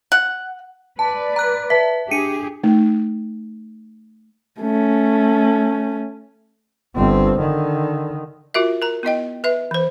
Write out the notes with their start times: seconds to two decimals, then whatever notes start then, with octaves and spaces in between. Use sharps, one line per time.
0.12 F#5
0.99 B4 D5 A5
1.36 A#5 F#6
1.70 B4 E5 A5 B6
2.11 D4 G4 G#4 C#7 D#7
2.63 A3 D#4
4.61 A3 C#4
6.95 G1 C4
7.39 D3 D#3
8.54 F4 F#4 A#4 E5
8.82 A#4 A#5
9.03 B3 E4 D#5 G5
9.44 B4 E5
9.71 E3 C5